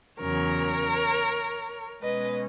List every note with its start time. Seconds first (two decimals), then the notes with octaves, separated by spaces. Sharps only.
0.20 E2 C#3 F#3 A#4 C#5
2.01 B2 G#3 C#4 B4 D#5